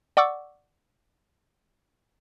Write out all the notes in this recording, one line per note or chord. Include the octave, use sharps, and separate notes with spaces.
D5 F#5 C#6 D6 E6